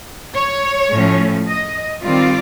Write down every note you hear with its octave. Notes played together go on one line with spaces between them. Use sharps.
C#5
A2 F3 A3 C#4
D#5
D#3 G3 C4 F4 D5